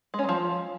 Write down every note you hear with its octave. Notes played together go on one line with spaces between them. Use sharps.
G#3
C#4
F#3
F3